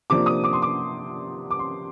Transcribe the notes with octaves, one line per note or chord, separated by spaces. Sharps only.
C3 F3 A#3 D4 D6
D#6
D6
C6
D6
D6
C6